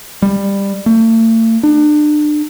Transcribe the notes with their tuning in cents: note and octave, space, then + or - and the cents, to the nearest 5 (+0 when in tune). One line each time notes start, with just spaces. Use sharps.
G3 +15
A3 +40
D4 +30